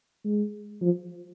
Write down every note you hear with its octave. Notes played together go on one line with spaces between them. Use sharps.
G#3
F3